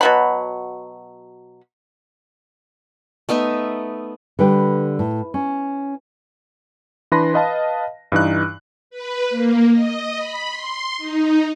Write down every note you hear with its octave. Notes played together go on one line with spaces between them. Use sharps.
B2 F#3 B5
A3 B3 D#4 E5
D3 G3 B4 G5
A2
C#4
E3 D4 B4 B5 C6 A#6
B4 D#5 F5 A5
G2 E3 D#4 F#6
B4
A#3
D#5
B5
C6
D#4